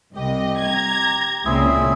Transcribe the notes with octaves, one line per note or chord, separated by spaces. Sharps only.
C2 G4 D#5
A#5 G#6
C#2 A#2 C#3 C4 E4 G#4